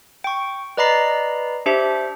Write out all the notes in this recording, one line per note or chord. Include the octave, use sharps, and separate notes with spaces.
G5 C#6
B4 D5 D#5 A#5 B5 C7
D4 G4 C5 E5